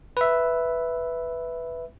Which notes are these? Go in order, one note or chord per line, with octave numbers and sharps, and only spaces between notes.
B4 E5